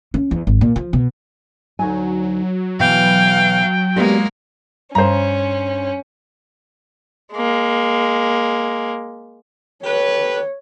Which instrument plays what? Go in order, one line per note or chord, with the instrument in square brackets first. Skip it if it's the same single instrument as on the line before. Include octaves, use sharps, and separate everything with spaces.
[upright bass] C#4
E2
G#1
A#2
F3
B2
[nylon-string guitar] D2 D#4 G#5 [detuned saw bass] F#3
[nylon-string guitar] B2 E3 E4 [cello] F5 [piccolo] G5
[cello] G#3 A#3 [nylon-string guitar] B3 D4 G4
[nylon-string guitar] G2 [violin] C#4 [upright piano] C5 A#5
[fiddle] G#3 A#3
[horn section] G4 A4 B4 [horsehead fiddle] C#5